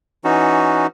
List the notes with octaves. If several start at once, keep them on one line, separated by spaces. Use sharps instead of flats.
E3 C#4 D#4 F#4